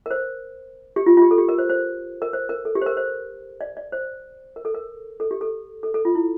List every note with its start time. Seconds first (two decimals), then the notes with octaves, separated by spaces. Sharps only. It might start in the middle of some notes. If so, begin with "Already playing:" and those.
0.06 A#4
0.11 C5
0.96 G4
1.06 F4
1.17 F4
1.22 G4
1.31 A4
1.38 G4
1.49 A#4
1.58 C5
1.69 C5
2.22 A#4
2.33 C5
2.49 A#4
2.65 A4
2.75 G4
2.82 C5
2.86 A#4
2.97 C5
3.61 D5
3.77 D5
3.92 C5
4.56 A#4
4.65 A4
4.74 A#4
5.20 A4
5.31 G4
5.41 A4
5.83 A4
5.94 A4
6.05 F4
6.15 E4